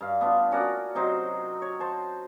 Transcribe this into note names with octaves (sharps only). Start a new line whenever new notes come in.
G2 F5
B3 D4 F4
C#4 F#4 A#4 D5
C3 F#3 D#4 C5
C#5
C5 A5